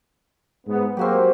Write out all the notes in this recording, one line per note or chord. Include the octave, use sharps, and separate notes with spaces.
G#2 B3
F#3 G#3 A#3 C4 F#4 G4